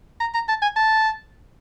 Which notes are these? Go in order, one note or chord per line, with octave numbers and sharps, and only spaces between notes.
A#5
A#5
A5
G#5
A5